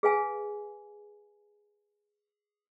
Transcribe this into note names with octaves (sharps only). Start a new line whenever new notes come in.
G#4 B4 F5 G#5